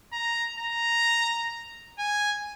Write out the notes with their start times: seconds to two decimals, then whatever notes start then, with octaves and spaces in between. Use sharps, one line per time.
0.13 A#5
0.59 A#5
1.99 G#5